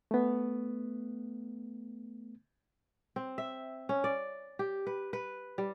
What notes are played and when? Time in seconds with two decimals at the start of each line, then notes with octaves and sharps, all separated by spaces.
0.11 A3 B3
3.16 C4
3.38 E5
3.89 C#4
4.04 D5
4.59 G4
4.87 B4
5.13 B4
5.58 G3